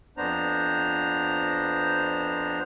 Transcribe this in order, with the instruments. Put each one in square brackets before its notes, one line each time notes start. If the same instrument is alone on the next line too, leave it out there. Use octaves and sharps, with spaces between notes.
[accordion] F2 B3 D4 C5 A#5